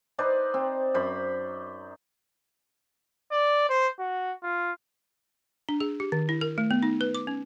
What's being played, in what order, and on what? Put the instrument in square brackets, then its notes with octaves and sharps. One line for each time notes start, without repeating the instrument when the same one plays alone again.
[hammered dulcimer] D#4 B4 C5 D5
C4
F#2 C5 B5
[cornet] D5
C5
F#4
F4
[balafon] D4
G#4
G4
D#3
E4
A#4
A3
B3
D#4
B4
D6
C#4